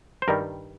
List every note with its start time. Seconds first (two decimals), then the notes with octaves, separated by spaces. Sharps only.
0.22 C5
0.28 G2 D#3 G3 A#4